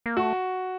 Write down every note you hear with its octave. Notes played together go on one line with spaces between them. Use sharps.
A#3
A3 F#4